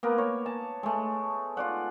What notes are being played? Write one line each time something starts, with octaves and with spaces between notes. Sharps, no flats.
A#3 B3 A#4
C#5
A5
G#3 A3
F4 D5 F#5